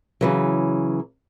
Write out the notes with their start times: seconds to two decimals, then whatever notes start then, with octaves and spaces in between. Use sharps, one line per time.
0.21 C#3 E3 F#3